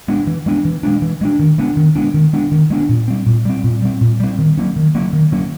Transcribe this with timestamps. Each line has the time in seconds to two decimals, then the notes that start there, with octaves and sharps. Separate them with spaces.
0.08 G#3 B3 D4
0.27 E3
0.46 G#3 B3 D4
0.65 E3
0.83 G#3 B3 D4
1.02 E3
1.21 G#3 B3 D4
1.40 D#3
1.58 G#3 B3 D4
1.77 D#3
1.96 G#3 B3 D4
2.14 D#3
2.33 G#3 B3 D4
2.52 D#3
2.70 G#3 B3 D4
2.89 A#2
3.08 G3 C4
3.26 A#2
3.45 G3 C4
3.64 A#2
3.82 G3 C4
4.01 A#2
4.20 G3 C4
4.39 D#3
4.58 F#3 A#3 C#4
4.76 D#3
4.95 F#3 A#3 C#4
5.13 D#3
5.32 F#3 A#3 C#4